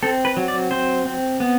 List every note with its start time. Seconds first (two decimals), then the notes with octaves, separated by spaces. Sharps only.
0.03 C4 A4
0.25 B4
0.37 F#3
0.48 D5
0.71 C4 C5
1.05 C4
1.40 B3